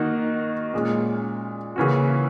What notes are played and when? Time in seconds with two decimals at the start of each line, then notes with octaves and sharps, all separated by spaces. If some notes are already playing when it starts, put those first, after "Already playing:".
Already playing: D#3 A#3 D#4 F#4
0.74 A#2 G#3 C#4
1.76 C#3 E3 A#3 C#4 F#4